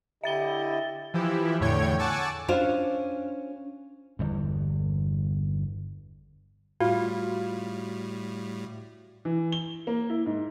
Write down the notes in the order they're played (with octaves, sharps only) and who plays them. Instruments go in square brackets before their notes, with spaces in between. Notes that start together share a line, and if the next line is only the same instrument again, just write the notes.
[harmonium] D3 E4 D#5 [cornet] G4 [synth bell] E5 A6 G7
[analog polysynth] E3 F3 E4 G4
E2 A2 D3 C#5 G5 G#6
F#5 G#5 A5 C#6 D6 E6
[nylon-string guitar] C#4 D4 F4 C5
[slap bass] G1 E2
[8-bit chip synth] A2 G3 [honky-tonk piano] F4 [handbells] F#4
[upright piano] E3
G7
A#3
E4
G#2